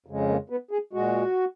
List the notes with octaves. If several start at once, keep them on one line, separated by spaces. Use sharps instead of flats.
F2 C#3 G#3
A#3
B3
G#4
A#2 G#3 F#4